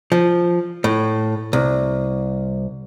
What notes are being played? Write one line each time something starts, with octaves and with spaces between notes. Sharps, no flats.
F3
A2
C2